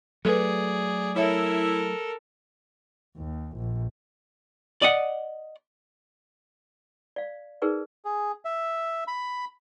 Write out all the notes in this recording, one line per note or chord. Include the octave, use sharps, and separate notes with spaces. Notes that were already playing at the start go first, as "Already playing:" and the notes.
F#3 A3 G#4 A4 B4 D5
E4 A4 A#4 C#5 E5
D#2
A#1
D5 D#5 F#5
D5 F5
D#4 G#4 A#4 B4 D5
G#4
E5
B5